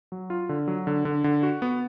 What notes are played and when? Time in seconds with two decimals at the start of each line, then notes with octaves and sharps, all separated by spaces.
0.12 F#3
0.30 F4
0.49 D3
0.68 F#3
0.87 D3
1.05 D3
1.24 D3
1.43 F#4
1.62 B3